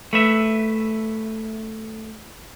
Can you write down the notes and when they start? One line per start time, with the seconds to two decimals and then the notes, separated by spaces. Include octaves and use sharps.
0.13 A3 B4 E5